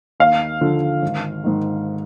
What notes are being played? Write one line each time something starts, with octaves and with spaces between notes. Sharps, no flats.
D#2 F5
D3 F3
G#1
G#2 D#3